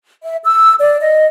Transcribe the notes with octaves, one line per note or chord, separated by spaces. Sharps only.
E5
E6
D5
D#5